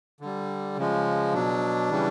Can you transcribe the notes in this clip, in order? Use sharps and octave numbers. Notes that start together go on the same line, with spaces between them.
D3 G3
C#3 F3 G#3
B2 F#3 D4
C#3 E3 G3